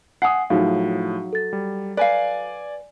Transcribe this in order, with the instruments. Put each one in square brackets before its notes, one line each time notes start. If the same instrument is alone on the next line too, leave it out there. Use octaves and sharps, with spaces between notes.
[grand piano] F#5 G#5 D#6 [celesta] C7
[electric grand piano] A2 F3 [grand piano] F#3 [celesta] D#4 G#4 F5
[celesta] A4 A6
[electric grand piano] G3
[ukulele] B4 F5 [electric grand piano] D5 G#5